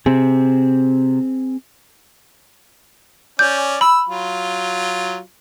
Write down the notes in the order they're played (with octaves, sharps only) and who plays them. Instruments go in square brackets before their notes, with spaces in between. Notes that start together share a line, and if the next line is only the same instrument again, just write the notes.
[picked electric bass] C3 [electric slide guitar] C4 G#4
[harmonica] C#4 D5 [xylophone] G6
[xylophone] B5 [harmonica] E6
[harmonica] F#3 F4